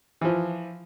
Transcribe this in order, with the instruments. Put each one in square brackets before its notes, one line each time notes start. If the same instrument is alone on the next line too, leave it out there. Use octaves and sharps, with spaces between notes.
[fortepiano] E3 F3